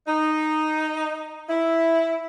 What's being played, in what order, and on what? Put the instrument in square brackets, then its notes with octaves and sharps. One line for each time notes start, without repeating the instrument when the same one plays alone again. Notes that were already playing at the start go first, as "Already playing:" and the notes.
[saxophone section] D#4
E4